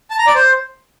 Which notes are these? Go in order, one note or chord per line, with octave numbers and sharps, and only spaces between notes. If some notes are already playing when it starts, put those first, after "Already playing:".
A5
A#5
D5
C5